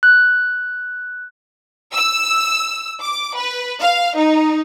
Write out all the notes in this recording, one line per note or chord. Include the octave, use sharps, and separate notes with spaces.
F#6
E6
D6
B4
F5
D#4